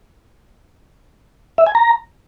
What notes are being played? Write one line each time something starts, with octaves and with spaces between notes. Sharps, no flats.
E5
G#5
A#5